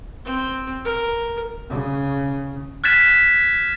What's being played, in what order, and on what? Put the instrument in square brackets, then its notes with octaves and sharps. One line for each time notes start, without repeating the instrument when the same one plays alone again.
[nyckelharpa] C4
A#4
[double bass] C#3
[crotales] F6 F#6 G#6 A6 B6 E7